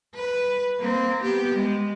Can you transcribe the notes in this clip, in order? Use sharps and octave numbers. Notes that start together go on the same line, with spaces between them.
B4
A#3 C4
B3 G4
G#3